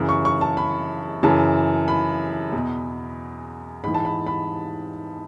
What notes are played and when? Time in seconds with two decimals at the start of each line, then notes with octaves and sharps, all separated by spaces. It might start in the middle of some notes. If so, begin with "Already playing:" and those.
Already playing: F#2 C#3 E3
0.09 C#6
0.25 C#6
0.41 A5
0.57 B5
1.23 F#2 C#3 E3 A5
1.88 B5
2.53 E2 B2
3.84 G#2 E3 B5
3.94 A5
4.05 B5
4.27 B5